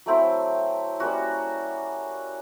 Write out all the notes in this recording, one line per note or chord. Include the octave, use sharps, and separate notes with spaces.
F#3 A3 C4 E4
G3 A#3 C#4 F#4